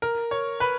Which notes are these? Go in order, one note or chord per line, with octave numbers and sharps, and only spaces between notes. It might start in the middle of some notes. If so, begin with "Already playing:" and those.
A#4
C#5
B4